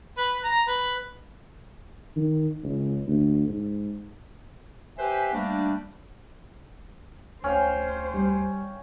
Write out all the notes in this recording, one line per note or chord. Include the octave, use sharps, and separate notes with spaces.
B4
A#5
B4
D#3
C#2
D2
G#2
G4 B4 C5 E5 G#5
G3 A3 A#3 D4
D2 C#4 C5 F5 G5
G3